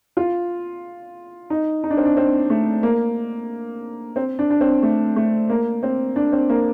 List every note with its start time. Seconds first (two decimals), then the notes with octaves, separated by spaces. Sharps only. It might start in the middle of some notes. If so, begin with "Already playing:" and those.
0.17 F4
1.50 D#4
1.84 D#4
1.90 D4
1.97 C4
2.05 D4
2.17 C4
2.50 A3
2.83 A#3
4.16 C4
4.39 D4
4.50 D4
4.61 C4
4.83 A3
5.16 A3
5.49 A#3
5.83 C4
6.16 D4
6.32 C4
6.49 A#3